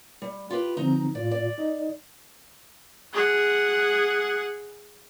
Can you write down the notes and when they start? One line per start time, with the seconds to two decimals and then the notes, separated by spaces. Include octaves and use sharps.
0.22 G3
0.50 F4 G4 B4
0.77 D3 F3 C4 D#4 A#5
1.15 A2 F4 D5
1.31 D5
1.58 D#4 D#5
3.13 G#4 F#5